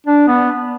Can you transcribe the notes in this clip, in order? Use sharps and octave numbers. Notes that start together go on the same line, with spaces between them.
D4
B3